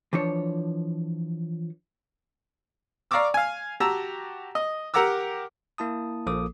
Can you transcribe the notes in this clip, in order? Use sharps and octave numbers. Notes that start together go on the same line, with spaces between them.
E3 F3 D4 C#5
D5 F5 A#5 C#6 D6 E6
F5 G#5
F#4 G4 A5 A#5 E6
D#5
G4 A#4 F#5 A#5 D6 E6
A#3 E4 A5 D#6
A#1 F3 A#3 A4 D6 D#6